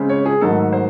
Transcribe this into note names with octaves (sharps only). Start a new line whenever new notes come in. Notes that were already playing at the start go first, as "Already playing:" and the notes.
Already playing: C#3 G#3 C4
C#5
G#4
G#2 D#3 F#3 A3 A4
C5